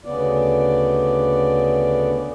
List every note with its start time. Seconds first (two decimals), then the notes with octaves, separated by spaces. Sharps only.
0.05 D2 C#3 B3 D5